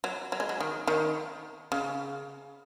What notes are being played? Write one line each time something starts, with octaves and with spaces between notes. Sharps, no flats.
F#3
F#3
G#3
F#3
D#3
D#3
C#3